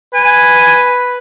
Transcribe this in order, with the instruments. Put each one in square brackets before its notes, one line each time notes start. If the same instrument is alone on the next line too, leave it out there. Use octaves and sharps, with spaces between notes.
[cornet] B4 [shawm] G#5